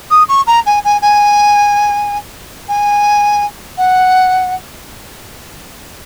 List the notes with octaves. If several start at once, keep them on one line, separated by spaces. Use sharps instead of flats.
D#6
C#6
A#5
G#5
G#5
G#5
G#5
F#5